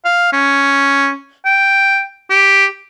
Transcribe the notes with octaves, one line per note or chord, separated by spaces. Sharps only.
F5
C#4
G5
G4